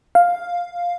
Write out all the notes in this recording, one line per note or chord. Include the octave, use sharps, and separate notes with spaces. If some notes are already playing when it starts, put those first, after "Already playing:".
F5